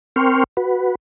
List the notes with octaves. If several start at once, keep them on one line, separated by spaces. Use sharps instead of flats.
C4 A#4 G5 C6 C#6 F6
F#4 B4